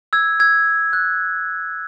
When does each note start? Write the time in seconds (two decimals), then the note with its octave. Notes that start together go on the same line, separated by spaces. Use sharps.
0.13 E6 G#6
0.40 E6 G#6
0.93 F#6